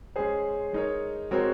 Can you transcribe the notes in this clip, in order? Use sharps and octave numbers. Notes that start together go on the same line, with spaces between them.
G#3 C#4 G#4 C5
G#3 D#4 A#4 C#5
G#3 C4 F#4 A#4 C#5